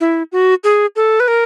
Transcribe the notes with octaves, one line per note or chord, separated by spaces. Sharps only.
E4
F#4
G#4
A4
B4
A#4